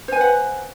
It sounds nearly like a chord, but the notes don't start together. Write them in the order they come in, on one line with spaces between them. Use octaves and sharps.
C5 G#5 B4 F#5